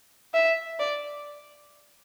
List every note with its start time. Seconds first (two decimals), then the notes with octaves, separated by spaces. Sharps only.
0.34 E5
0.79 D5